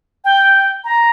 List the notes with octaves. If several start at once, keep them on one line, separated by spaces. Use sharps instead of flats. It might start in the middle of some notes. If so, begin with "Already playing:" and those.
G5
A#5